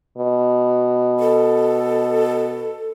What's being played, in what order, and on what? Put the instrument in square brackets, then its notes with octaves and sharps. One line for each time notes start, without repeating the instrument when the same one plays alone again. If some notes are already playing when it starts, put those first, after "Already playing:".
[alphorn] B2
[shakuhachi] A4